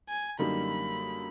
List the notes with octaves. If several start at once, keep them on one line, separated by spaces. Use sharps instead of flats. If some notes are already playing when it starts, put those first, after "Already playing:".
G#5
F#2 D3 G3 A#3 D#4 B5